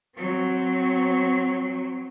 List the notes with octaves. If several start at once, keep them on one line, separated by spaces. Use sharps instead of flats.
F#3 C4